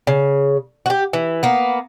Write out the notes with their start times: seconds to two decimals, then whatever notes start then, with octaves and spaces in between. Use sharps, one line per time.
0.07 C#3
0.86 F#4 G4
1.13 E3
1.43 A#3 B3